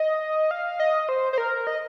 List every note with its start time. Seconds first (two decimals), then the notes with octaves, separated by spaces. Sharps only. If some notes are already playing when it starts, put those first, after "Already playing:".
Already playing: D#5
0.51 F5
0.80 D#5
1.09 C5
1.33 C5
1.38 A#4
1.67 D#5